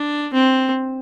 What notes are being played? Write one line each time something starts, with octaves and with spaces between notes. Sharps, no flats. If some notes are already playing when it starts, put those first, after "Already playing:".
Already playing: D4
C4